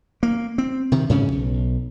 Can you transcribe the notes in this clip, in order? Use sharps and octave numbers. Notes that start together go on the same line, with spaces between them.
A#3
C4
C3 D#3
G#2 C#3 C#4
B1